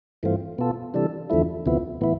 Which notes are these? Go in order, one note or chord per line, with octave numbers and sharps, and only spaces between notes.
G2 E3 A3 C4 F4
B2 B3 F4 A4
C3 E3 G3 D4 A4
E2 D3 F3 A3 E4
D2 C3 F3 B3 E4
A2 E3 B3 E4